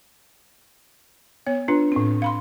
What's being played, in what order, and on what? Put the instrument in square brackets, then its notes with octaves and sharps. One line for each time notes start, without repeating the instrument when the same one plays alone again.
[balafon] B3 [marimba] C#5
[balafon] D4 F4 B4
[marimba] A2 C4
[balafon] F5 B5 C6